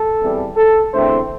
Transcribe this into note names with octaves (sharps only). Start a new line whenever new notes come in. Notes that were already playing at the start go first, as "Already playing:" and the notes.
Already playing: A4
E2 C3 E3 G3
A4
E2 D3 A3 C4 C5